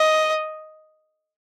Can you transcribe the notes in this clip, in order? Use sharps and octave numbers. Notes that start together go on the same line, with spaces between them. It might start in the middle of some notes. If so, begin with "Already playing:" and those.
Already playing: D#5